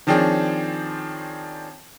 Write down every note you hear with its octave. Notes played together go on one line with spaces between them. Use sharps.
D#3 F3 C4 D4 G#4 C#5